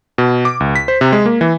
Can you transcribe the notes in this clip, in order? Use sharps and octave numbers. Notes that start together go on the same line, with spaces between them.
B2
D6
C#2
B6
C5
C3
G#3
A#3
E3